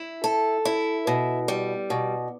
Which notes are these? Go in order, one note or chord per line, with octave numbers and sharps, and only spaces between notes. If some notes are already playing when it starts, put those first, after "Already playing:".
Already playing: E4
A4
E4
B2
G3
B2